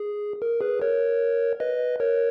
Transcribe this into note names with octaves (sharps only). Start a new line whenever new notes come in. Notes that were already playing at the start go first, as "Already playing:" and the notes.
Already playing: G#4
A#4
G#4 B4
A#4 C#5
B4 D#5
A#4 C#5